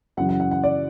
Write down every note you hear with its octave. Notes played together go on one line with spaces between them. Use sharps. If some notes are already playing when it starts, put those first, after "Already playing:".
F#2 C#3 E3 F#5
F#5
F#5
F#5
D5